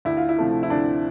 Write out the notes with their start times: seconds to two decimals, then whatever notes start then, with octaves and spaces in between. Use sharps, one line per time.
0.05 D2 E4
0.17 F4
0.29 E4
0.38 C3 F3 A3
0.63 E4
0.70 D2 D4